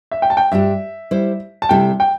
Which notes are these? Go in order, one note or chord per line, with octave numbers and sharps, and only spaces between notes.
E5
G5
A5
G5
G2 G3 D4 G4 E5
G3 E4 C5
A5
C3 G3 E4 A4 G5
G5